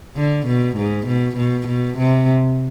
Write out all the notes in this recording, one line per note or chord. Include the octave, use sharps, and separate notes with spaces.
D3
B2
G#2
B2
B2
B2
C3